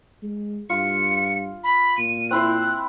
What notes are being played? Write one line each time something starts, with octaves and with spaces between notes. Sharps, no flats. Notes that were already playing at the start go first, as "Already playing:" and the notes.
G#3
G2 F4 C#7
B5
A#2 D#7
C4 E4 C5 F#6